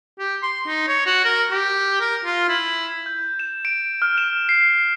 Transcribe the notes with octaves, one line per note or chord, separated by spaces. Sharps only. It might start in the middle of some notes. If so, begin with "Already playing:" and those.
G4
C6
D#4
C#5
F#4
A#4
G4
A#4
F4
E4
G6
E7
D7
F6
E7
C7